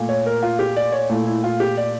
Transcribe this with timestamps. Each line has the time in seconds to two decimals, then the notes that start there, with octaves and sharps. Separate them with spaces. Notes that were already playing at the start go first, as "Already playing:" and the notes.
Already playing: A#2 A3
0.09 C#5
0.26 A#4
0.43 F4
0.59 G4
0.76 D5
0.92 C#5
1.09 A#2 A3 E4
1.27 E4
1.44 F4
1.60 G4
1.77 D5